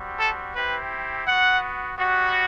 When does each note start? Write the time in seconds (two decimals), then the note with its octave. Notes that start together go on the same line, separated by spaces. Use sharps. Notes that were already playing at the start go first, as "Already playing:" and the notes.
Already playing: G3 C4 F#4
0.17 A4
0.54 C4 E4 G4 B4
1.25 B3 F#4 F#5
1.96 G3 B3 F#4